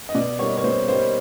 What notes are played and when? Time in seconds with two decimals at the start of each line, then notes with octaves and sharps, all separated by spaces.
0.09 D#5
0.15 B2 D5
0.39 G3 A#3 D#4 C#5
0.57 C#5
0.64 B2 C5
0.88 G3 A#3 D#4 C5